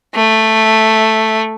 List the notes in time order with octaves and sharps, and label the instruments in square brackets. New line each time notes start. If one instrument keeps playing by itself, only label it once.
[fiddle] A3